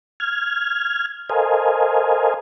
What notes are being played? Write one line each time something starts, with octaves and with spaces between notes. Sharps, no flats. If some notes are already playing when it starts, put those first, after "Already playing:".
F6 G#6
A4 A#4 C5 D#5 F5 G#5